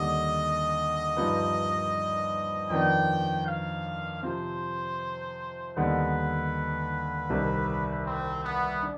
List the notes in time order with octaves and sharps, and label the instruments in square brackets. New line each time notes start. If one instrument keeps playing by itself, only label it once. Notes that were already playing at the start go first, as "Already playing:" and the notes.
Already playing: [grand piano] D#2 D3 G3 D4 [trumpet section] D#5
[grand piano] G2 F3 C4 D#4 B4
[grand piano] F2 D#3 B3 D4 [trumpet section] G5
[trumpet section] F5
[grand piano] C3 F3 C4 [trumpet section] C5
[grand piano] D#2 D3 G3 B3 D#4 [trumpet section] B4
[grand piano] C2 C3 D#3
[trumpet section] C4
B3
[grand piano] D4